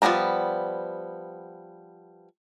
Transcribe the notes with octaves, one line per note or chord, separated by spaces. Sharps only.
F3 G3 B3 D4 A#5